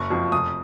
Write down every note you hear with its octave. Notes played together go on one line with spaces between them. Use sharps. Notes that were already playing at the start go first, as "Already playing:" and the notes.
Already playing: F#1 C#6
F2 F3
F1 D#6